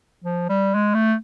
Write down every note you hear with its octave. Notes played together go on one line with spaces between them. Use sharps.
F3
G3
G#3
A3